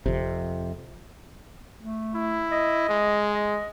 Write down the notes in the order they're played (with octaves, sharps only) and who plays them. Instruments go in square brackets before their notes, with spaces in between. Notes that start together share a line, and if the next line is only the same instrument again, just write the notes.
[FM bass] G1 [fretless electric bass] F2 C3
[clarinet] A3
[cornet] E4
[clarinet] D#5
[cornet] G#3
[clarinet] D#5